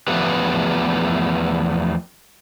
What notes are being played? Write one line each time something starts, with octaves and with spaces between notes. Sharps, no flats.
E2 F3 A3 B3 G4 B4